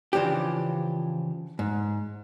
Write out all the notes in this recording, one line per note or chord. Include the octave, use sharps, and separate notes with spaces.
C#3 E3 F3 D4 G4
G#2